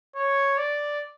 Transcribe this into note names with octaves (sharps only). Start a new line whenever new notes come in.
C#5
D5